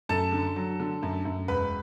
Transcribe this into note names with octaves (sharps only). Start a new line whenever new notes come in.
F#2 A4 A5
D3
F#3
D3
F#2
F#2
E1 B4 B5